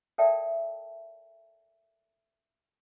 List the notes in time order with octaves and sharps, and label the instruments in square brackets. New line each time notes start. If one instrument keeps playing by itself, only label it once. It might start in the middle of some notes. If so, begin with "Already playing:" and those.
[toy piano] A4 A#4 D5 E5 G5 A5